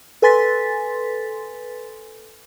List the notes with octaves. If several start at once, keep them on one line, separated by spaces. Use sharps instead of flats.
A4 B4 G#5 C6 A6 B6